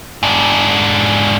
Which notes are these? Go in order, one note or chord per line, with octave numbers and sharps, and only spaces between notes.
G#2 D4